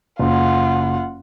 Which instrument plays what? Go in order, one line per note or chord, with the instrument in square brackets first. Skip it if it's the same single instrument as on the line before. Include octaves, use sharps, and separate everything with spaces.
[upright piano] F#1 [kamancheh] F4 F#5